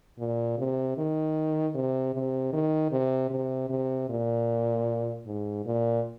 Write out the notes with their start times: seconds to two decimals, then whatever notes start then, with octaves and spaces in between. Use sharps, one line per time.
0.19 A#2
0.58 C3
0.97 D#3
1.74 C3
2.14 C3
2.53 D#3
2.92 C3
3.30 C3
3.69 C3
4.09 A#2
5.26 G#2
5.65 A#2